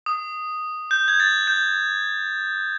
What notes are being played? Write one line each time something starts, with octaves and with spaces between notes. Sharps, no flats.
D#6
G6
G#6
A6
G6